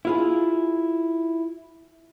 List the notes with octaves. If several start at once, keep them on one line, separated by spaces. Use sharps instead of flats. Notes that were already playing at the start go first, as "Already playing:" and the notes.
E4 F4 G#4